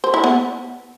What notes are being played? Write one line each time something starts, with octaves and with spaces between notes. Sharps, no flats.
C5
E4
B3